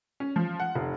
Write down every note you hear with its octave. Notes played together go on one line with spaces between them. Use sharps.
C#4
F3
F#5
F1